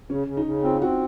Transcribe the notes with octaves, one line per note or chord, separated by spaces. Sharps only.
C#3 C#4
C#3
D#4
C#3
C4 F4
C4 F#4